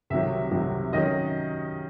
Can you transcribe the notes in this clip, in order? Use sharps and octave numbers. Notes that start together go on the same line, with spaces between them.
C2 C3 D#3 F#3 E5
C2 C3 D#3 F#3
D#3 F#3 C#4 D#5